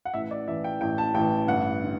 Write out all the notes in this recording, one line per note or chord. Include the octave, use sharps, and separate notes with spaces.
F#5
A1 A2 E3 E5
D5
A1 A2 E3 E5
G5
A1 A2 E3 G5
A5
A1 A2 E3 G5
A1 G2 D3 F#5
D3